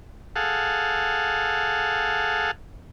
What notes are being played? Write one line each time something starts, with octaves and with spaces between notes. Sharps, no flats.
G#4 A4 F5 F#5